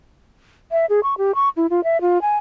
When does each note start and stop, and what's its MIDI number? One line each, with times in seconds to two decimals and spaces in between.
0.71 0.86 76
0.89 1.00 68
1.03 1.14 85
1.18 1.35 67
1.35 1.49 85
1.56 1.66 64
1.70 1.83 65
1.84 2.00 76
2.01 2.21 65
2.21 2.37 80